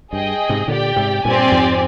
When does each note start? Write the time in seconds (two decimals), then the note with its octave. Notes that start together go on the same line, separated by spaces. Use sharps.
0.12 G2 G#4 D#5 G5
0.49 G#2 C3
0.68 A#2 D3 G4 D5 G5
0.96 G#2 C3
1.25 G2 A#2 C4 G4 D5 G#5
1.52 F2 G#2